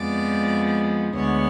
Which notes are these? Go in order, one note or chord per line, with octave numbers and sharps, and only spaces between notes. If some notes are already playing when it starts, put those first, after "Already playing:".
Already playing: F2 F3 G#3 B3 D5
D2 D3 G#3 B3 C#5